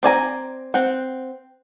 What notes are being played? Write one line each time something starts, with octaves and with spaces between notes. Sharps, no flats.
C4 D5 G#5 A#5
C4 F#5